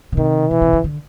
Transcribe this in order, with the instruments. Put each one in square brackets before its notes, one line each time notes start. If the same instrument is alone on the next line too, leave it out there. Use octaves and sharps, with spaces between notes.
[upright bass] C#3
[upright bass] C3 [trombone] D#3
[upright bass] B2 [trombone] E3
[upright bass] C3
C#3
D3